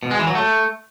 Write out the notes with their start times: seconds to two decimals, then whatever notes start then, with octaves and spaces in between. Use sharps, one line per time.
0.03 B2
0.11 G#3
0.19 E3
0.27 F#3
0.35 A3